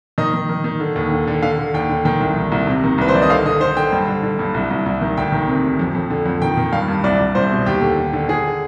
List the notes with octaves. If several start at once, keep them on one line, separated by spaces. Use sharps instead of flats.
D#3 D#5
D#3
D#3
D#3
D3
D#2
D3
D3
D3 F5
D3
D#2 G5
D3
D#3 G5
C2
D#3
C2
C3
D#3
C2 B4
C5
D#3 D5
D#5
D3 F5
D3 D#5
D3 C5
D3 G5
G2
D3
D3
G2
C2
C2
C2
D#3
D2 G5
D#3
C3
D2
F2
F2
D3
F2
D#3 G5
D#3
G2 F5
G2
C2 D5
C2
C2 C5
B2
D#2 G4
D3
D3
D3
D3 G#4